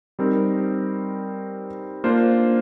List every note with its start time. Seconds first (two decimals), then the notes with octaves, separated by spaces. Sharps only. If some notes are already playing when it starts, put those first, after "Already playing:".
0.19 G3 C4 D#4 A#4
2.04 A#3 D4 F4 C5